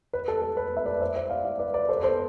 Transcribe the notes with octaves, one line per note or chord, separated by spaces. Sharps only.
B4
A4
A4
B4
E5
B4 D5
C5 E5
C5 E5
D5 F5
D5 F5
B4 D5
B4 D5
A4 C5
B4
A4 C5